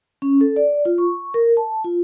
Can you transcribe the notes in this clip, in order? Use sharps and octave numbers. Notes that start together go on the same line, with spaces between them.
C#4
A4
D5
F4
C#6
A#4
A5
F4